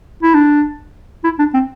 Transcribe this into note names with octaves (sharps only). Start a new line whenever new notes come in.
E4
D4
E4
D4
C4